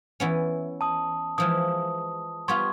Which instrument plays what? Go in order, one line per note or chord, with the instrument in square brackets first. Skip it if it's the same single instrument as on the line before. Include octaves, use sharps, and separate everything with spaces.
[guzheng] E3 B3 C#4
[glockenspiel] A5 D#6
[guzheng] E3 F3 G#3 [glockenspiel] D#6
[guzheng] G3 B3 F4 [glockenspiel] C6 C#6 G#6